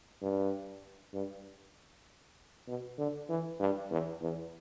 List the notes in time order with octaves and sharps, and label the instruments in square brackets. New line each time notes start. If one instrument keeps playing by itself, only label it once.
[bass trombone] G2
G2
B2
D3
E3
G2
E2
E2